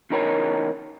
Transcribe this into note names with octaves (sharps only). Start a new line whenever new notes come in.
E2 C#3 D#4 A#4 C#5 B5